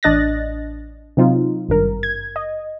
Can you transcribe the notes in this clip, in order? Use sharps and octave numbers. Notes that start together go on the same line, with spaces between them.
A1 D4 D#5 F#6 A6 A#6
C3 F#3 C4 D#4 F4
G#1 G2 A#4
G#6
D#5